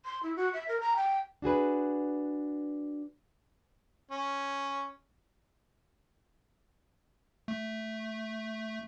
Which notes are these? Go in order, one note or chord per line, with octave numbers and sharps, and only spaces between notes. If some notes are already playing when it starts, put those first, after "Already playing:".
C6
E4
F#4
E5
A#4
A#5
G5
D4 F#4 G#4 B4
C#4
A3